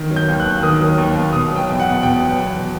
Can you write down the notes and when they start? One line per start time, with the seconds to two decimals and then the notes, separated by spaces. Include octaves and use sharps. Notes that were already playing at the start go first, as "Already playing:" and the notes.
Already playing: D#3
0.11 F#3
0.16 G6
0.28 D#2
0.40 F#6
0.45 D#2
0.63 D#3 D#6
0.81 F#3
0.98 D#2
1.15 D#2
1.33 B2 D#6
1.51 F#3
1.56 G5
1.68 E2
1.80 F#5
1.85 E2
2.03 B2 G5
2.20 F#3
2.38 E2